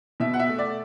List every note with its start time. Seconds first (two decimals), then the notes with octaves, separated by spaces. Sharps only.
0.20 B2 E5
0.34 F#5
0.39 E5
0.49 A3
0.58 D5